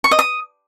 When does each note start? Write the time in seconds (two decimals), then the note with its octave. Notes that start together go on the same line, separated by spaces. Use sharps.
0.04 C#6
0.11 D#5
0.19 D#6